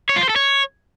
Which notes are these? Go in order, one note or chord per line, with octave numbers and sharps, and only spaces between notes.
C#5
F4
C5
A4
C#5